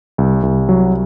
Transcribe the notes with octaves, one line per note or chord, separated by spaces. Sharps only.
C2
C2
F#3